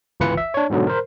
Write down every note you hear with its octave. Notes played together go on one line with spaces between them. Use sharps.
G1 C#2 E3 F4 B4 C#7
E5
D4 C#5
G#2 B2 D3 F#3
A#4 C5